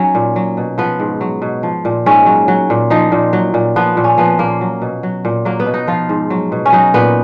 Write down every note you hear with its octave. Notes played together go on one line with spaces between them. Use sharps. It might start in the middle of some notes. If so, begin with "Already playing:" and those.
Already playing: F#3 C#4 D#4
A#2
F#3
B2
F3 B3
G#2
F#3
B2
F3
A#2
G#2 C#4
F#3
F#3
A#2
F3 D#4
A#2
F#3
A#2
F3 B3
A#2
C#4
F3 B3
A#2 A#3
F#3
B2
F#3
A#2
F#3 A#3
B3
B2
D#4
F3 F4
G#2
F#3
B2
C#4
F#3 D#4
A#2 B3